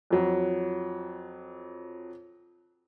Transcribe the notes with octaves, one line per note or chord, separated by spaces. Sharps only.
F2 F#3